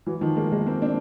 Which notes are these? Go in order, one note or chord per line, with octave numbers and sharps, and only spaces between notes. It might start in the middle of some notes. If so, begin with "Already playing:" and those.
E3 F#3
D#3 F3
G#3 A#3
G#3 A#3
A#3 C4
C4 D4